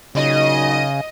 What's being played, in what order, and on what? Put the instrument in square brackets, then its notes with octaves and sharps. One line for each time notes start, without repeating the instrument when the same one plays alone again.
[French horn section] A#2 F#3 D#4 [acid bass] C#3 [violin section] D#5